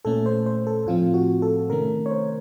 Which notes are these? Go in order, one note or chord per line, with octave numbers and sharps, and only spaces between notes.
A#2 A3 C#4 A4
C5
C5
A4
A2 F3 C4 F4
F#4
A4
C3 D#3 A3 C#4 A#4
C#5
C5